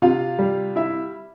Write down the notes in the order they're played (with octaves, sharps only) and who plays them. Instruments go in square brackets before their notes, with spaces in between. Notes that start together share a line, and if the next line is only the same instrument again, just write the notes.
[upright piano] C3 F4 F5
G3
E4 E5